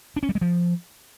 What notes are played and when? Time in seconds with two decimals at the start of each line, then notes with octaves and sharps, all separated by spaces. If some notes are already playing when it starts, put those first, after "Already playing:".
0.16 D4
0.23 C#4
0.29 G3
0.35 G#3
0.41 F3